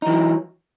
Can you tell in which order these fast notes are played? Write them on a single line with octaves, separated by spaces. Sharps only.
D#4 E3 F#3